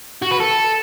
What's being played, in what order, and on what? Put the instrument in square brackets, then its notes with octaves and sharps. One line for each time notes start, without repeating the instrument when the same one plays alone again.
[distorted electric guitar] F#4
B4
A4